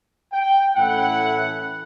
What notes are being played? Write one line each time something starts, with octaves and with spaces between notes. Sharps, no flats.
G5
A2 E3 A3 C#4 E4 F#5